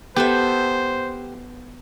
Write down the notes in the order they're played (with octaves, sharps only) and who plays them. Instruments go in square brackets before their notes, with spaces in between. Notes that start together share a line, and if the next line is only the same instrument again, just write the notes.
[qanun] B3 A4 E5 [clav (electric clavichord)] G4 [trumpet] C5